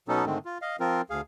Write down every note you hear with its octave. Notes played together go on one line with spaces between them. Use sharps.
B2 F#3 B3 C#4 D#4 A4
G#2 D3 D#3 G#3 A3 C4
F4
D#5 F5
F3 C4 F4 A#4
D2 G#4 F5